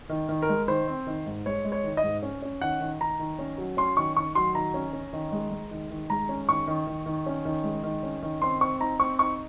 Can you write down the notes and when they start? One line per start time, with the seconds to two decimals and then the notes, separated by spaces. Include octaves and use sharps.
0.10 D#3
0.29 D#3
0.42 A#4
0.49 G#3
0.68 D#3 C5
0.88 C4
1.07 D#3
1.26 G#2
1.46 G#3 C#5
1.65 G#3
1.72 C#5
1.84 D#3
1.97 D#5
2.03 G#2
2.23 C#4
2.42 C#4
2.61 D#3 F#5
2.81 D#3
3.00 D#3 A#5
3.19 D#3
3.39 C#4
3.58 F#3
3.77 C#4 C6
3.96 D#3 C#6
4.17 D#3 C#6
4.35 F#3 C6
4.55 D#3 A#5
4.74 C#4
4.93 C#4
5.13 D#3
5.32 G#3
5.51 G#3
5.71 D#3
5.91 D#3
6.10 G#3 A#5
6.29 C#4
6.49 D#3 C#6
6.67 D#3
6.87 D#3
7.06 D#3
7.26 C#4
7.45 D#3
7.64 G#3
7.84 D#3
8.03 C#4
8.23 D#3
8.42 C4 C6
8.61 C4 C#6
8.80 D#4 A#5
9.00 C4 C#6
9.19 D#4 C#6